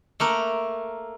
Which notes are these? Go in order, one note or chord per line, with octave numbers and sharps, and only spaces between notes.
A3 A#3 A#4